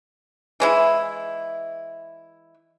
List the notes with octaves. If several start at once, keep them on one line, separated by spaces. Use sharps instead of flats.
E3 G#3 E4